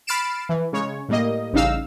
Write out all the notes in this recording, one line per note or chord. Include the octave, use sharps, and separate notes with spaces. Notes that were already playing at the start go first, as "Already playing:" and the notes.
B5 F6 A6 C7 D7 E7
E3
C#3 G#3 C#5
A2 G3 A#3 D#5
A1 C#3 G3 D#4 F5 E6